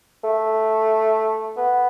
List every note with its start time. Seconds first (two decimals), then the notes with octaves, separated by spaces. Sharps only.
0.24 A3
1.57 B3